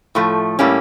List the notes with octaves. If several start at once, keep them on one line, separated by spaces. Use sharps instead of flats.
A2 F3 A3
A2 G3 A#3 C#4